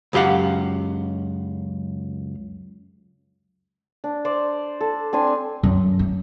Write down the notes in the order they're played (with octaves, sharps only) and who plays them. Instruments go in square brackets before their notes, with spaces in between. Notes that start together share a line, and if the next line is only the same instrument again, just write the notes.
[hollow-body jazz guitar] C#2 F#2 G4 F5 F#5
[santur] D4
C5 D5 C6
A4
C4 D4 G#5 C6
[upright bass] F#2
A3